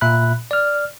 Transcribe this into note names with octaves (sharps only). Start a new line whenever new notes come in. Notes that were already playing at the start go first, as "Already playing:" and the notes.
A#2 E5 B5 F#6
D5 F6